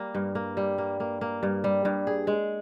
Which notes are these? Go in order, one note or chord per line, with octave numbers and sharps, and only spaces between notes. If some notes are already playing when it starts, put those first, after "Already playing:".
Already playing: G3 A#3
G2
A#3
G3
A#3
A#3
A#3
G2
G3
G2
G#4
G#3